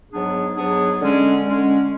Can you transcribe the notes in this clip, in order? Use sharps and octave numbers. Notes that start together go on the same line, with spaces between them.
G#2 F#3 B3 D4 G#4
G#2 F#3 B3 D4 G#4
D3 G#3 C#4
D3 G#3 C#4